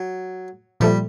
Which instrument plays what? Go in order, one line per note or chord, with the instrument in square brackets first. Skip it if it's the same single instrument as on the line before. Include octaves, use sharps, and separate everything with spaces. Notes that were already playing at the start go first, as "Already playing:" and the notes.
Already playing: [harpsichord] F#3
[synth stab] A#2 F3 A3 [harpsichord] G3